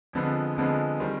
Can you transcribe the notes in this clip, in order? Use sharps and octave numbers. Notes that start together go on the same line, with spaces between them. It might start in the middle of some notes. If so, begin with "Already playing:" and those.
F2 D3 F3 G#3 B3
F2 D3 F3 G#3 B3
D#3 G3 C4